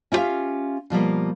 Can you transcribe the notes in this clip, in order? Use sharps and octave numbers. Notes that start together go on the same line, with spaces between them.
C#4 E4 F4 G4 E5 F5
B2 F3 G3 A#3